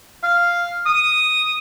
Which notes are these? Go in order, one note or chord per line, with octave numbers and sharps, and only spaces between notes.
F5
D#6